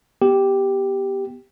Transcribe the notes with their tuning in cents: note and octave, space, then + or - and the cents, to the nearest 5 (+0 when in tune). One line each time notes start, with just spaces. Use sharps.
B3 +0 G4 +0